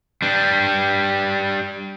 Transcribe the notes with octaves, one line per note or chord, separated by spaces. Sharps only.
G3 D4